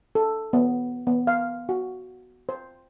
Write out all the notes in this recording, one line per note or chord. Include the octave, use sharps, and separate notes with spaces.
A4
B3
B3
F5
F#4
C5